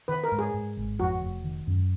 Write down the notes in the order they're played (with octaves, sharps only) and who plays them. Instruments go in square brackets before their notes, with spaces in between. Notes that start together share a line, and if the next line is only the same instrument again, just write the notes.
[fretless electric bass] D#3 [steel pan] B4
[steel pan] A#4
[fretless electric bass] G#2
[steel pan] G#4
[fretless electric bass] G#2
G#1
[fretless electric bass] F2 [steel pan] F#4
[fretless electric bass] F1
D#3
F#2